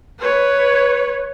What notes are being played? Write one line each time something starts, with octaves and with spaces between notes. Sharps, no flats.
B4 C#5